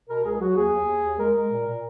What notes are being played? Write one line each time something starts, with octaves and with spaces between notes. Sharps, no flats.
B2 A#4
C#2 G#4
F#3 F#4
D#2 G#4
D#2
D#2
D#2
G#3 A#4
G#3
A#2
A#2